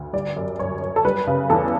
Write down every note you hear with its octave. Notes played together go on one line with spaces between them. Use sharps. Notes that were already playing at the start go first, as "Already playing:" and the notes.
Already playing: D2
G3 D5
F#2
F#2 C#5
F#2
A4
G3 B4
C#3
E2 A4